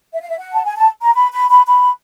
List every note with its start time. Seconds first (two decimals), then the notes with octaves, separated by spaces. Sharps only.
0.13 E5
0.20 F5
0.29 E5
0.38 F#5
0.53 A5
0.64 G#5
0.76 A5
1.01 A#5
1.14 B5
1.31 B5
1.49 B5
1.66 B5